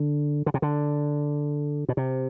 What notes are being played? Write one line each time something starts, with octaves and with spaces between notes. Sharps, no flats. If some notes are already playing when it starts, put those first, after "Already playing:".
Already playing: D3
D3
C3
D3
B2
C3